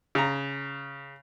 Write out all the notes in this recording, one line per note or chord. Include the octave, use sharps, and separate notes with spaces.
C#3 A#5